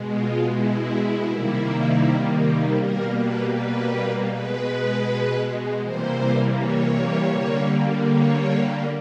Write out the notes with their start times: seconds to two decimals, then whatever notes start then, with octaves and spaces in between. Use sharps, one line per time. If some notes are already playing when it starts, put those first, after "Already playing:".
Already playing: B2 G#3
0.13 F4
0.50 E4
1.26 C3 D#3 G3 A#3
2.77 B2 G3 A#3 A#4
3.16 B4
3.53 B4
4.28 B2 G#3 B4
5.79 C3 E3 G3 A#3 C5
6.56 C#5
7.32 D3 G3 A#3
8.08 C#5